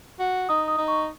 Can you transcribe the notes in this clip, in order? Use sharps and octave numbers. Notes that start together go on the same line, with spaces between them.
F#4
D#4 D#6
D#6
D#4
C#6